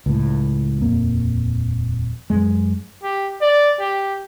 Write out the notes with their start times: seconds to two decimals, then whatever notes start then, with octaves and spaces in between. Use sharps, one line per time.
0.06 C#2 A2
0.81 D#1 F2 A#3
2.30 F#2 G#3
3.03 G4
3.41 D5
3.80 G4